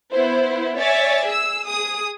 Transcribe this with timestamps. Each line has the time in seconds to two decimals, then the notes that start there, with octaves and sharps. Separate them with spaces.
0.11 B3 E4 C5
0.77 C#5 D5 E5 G#5 A6
1.25 G#4 E6
1.66 G#4 D#6